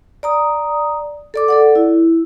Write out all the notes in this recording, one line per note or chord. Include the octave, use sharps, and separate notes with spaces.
D5 A#5 D#6
A4 D5 D6
A4 D5 F#5
E4